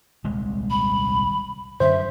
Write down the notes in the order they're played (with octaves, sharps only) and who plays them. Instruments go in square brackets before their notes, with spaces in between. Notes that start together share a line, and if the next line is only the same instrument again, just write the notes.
[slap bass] D#1 C2 G#3
[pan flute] B5
[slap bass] F#2 D3 C#4 [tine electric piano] C5 [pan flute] E5